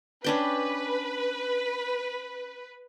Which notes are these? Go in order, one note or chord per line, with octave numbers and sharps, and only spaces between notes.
C#4 D4 B4 G5